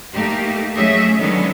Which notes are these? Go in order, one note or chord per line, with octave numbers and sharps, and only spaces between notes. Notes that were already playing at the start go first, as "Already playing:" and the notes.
A3 A#3 D#4 G4
F#3 A3 C#4 G#4 D#5 E5
D3 D#3 F#3 G#3 B3 C#4